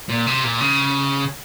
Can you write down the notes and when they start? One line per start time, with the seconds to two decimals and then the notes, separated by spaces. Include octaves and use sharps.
0.09 A#2
0.26 C3
0.44 A#2
0.60 C#3